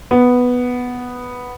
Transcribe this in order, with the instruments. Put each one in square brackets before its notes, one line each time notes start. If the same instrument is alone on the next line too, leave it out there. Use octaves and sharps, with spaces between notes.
[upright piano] B3